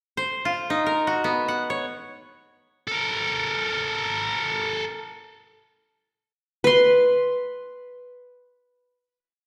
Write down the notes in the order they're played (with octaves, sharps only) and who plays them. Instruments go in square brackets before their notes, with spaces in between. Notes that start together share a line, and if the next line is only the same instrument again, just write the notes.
[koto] C5
F4
D#4
A#4
F#4
B3
F#5
C#5
[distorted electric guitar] A4 A#4
[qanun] B4 C6